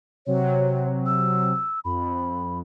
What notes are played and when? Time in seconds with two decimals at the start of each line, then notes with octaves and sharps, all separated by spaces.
0.26 C3 F#3 C#5
1.06 E6
1.85 F2 B5